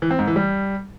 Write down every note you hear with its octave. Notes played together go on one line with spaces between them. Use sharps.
E3
C4
G#2
E3
G3